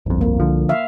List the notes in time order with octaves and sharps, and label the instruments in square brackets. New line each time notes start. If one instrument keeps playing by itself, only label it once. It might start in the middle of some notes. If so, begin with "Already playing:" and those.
[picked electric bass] G1 F2 [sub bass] C2
[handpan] A#3
[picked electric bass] D3 F3
[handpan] E5 F5